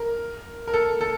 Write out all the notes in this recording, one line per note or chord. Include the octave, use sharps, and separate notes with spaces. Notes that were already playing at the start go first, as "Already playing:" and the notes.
Already playing: A#4
A#4
A4
A4